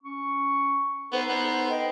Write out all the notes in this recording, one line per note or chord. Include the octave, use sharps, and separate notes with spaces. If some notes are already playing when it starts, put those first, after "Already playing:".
C#4 C#6
B3 D#4 A4 C5
B3
D#5 G5